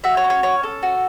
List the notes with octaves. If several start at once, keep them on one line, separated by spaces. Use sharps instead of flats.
F#4 E5
C#5
C#4
C#5
C#4 C#5
A4
F#4